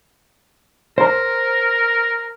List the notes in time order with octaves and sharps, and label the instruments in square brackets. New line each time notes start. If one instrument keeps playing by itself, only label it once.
[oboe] A#4 [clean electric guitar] C5 A#5